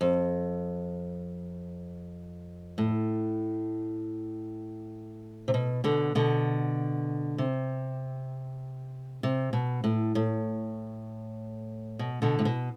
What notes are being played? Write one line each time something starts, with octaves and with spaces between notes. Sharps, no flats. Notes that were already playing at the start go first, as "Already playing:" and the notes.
F2
A2
C3
B2
B2 D3
B2 D3
C3
C3
B2
A2
A2
B2
B2 D3
A2
B2